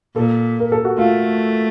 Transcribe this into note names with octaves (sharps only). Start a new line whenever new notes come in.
A#2 A4
A#4
A4
F#4
A3 F4